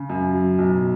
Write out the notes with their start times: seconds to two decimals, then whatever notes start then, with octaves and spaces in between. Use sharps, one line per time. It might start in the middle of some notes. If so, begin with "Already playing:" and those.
Already playing: C#3
0.09 F#2
0.34 F#3
0.58 B1